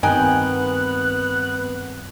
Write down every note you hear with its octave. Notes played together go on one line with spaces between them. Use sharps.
G2 D#3 B3 C4 D#4 G5 G#5 F#6